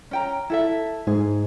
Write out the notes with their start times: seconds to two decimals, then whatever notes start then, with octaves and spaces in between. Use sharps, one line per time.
0.11 C#4 G5 A#5
0.50 E4 A4 E5
1.07 G#2 G#4